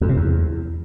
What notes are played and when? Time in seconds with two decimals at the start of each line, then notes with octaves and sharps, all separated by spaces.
0.01 F2
0.09 C3
0.16 E2